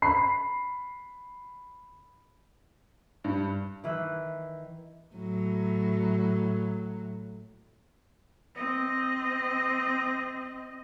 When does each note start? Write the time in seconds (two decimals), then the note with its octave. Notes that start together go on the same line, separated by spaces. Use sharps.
0.02 B5 C7
3.24 G2
3.84 D#3 E3 E6 F#6
5.15 A2 F#3
8.55 C4 D#5